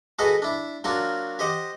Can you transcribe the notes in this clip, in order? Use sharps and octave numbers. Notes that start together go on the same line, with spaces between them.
F#4 G#4 A4 B4 D#5 F#5
D4 E4
F#3 A#3 D4 F4 F#4
G4 C5 D#5 F#5